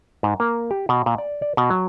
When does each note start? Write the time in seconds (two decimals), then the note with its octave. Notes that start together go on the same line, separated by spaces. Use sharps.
0.23 G#2
0.40 A#3
0.71 G4
0.89 B2
1.06 A#2
1.18 D5
1.42 D5
1.57 B2
1.70 F#3